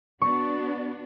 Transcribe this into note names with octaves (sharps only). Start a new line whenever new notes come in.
B3 D4 F#4 C#6